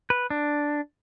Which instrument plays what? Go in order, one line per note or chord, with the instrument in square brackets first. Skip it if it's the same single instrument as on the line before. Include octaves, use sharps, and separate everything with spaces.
[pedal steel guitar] B4
D4